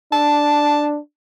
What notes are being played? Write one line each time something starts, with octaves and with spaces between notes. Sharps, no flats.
D4 A5